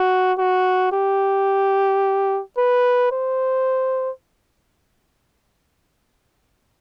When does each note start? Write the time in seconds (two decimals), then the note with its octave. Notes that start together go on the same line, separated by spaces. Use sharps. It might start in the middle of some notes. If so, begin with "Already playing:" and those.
Already playing: F#4
0.39 F#4
0.93 G4
2.58 B4
3.12 C5